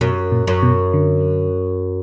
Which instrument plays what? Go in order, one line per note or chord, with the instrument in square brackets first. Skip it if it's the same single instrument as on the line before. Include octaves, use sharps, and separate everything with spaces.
[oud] F#2 [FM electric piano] B2
[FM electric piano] A#2
[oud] F#2
[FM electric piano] B2
D3